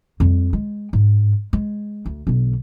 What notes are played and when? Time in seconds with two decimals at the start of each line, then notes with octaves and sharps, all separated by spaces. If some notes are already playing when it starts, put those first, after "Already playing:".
0.20 F2 G3
0.53 G#3
0.93 G#2
1.53 G#3
2.06 D2
2.27 B1 D3